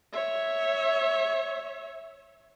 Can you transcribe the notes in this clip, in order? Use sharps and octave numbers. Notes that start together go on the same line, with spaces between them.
C#5 E5